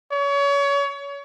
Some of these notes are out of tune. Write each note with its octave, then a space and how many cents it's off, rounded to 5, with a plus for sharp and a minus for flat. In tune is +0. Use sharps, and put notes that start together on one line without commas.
C#5 +30